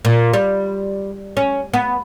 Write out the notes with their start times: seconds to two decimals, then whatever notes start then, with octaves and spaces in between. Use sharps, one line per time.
0.05 A#2
0.33 G3
1.37 C#4
1.74 B3